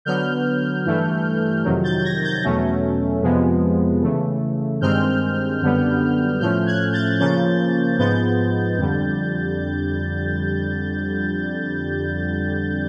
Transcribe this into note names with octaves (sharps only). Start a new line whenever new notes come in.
D3 F#3 B3 F6 G6
G2 E3 A3
F2 C3 D#3 F#3
G6 A6
G#6 A#6
G6 A6
E2 B2 F#3 A3 C#4
F2 C3 F3 G#3 B3
C#3 E3 A3
G2 D#3 G#3 C4 F6 G6
F#2 D3 G3 B3
A2 F3 A3 C#4 F6 G6
F#6 G#6
G6 A6
C#3 F3 A#3 C#4 G6 A6
G#2 F3 G#3 B3 G6 A6
F2 D3 G3